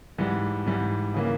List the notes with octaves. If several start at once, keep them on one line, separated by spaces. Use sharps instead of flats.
G#2 E3 G3
G#2 E3 G3
C#3 E3 A#3